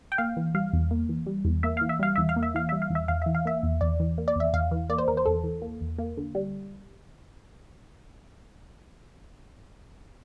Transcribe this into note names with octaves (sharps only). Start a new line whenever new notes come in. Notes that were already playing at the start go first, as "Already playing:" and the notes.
G5
A#3 F5
E3
G3 F5
E2
A#3
E3
G3
E2
A#3 E5
E3 F5
E5
G3 F5
E2 E5
F5
A#3
E5
E3 F5
G3 E5
F5
E2
E5
E2 F5
E3 E5
F5
A#3 E5
E2
E2 D5
E3
A#3
D5
E2 E5
E2 F5
E3
A#3 D5
C5
E2 A#4
C5
E2 A4
E3
A#3
E2
A#3
D3
G3